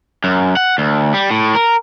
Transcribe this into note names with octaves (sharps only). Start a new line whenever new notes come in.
F#2
F#5
D2
G3
A2
A#4